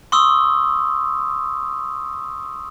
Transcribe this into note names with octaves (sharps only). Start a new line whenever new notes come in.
C6 C#6 D#6 E6